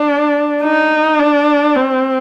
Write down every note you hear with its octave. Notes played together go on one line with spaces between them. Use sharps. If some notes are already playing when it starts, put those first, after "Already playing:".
Already playing: D4
D#4
D4
C4